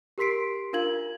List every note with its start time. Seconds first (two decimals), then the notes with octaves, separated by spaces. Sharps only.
0.18 G4 A#4 C6 B6 C7 D7
0.73 D4 F4 A#4 F5 G#6 F#7